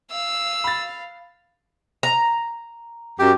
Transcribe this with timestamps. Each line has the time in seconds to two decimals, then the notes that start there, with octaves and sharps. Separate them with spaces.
0.11 F5 E6
0.64 B5 A6
2.03 A#5
3.19 F#2 G4